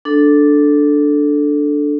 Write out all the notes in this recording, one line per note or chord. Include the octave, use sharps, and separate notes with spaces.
D4 A4